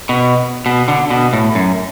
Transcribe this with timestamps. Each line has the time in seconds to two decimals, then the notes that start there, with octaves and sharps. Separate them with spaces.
0.09 B2
0.66 B2
0.88 D3
1.10 B2
1.33 A2
1.55 F#2